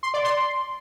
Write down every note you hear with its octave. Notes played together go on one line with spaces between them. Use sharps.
C6
D5
C6